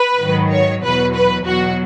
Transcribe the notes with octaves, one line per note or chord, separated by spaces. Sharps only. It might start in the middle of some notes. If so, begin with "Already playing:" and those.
Already playing: B4
G#2 D#3 F#3
C#5
E2 B2 F#3 B4
B4
E2 B2 F#3 F#4